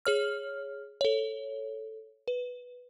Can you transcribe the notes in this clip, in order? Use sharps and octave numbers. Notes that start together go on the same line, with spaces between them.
G#4 C#5 F6
A4 C#5
B4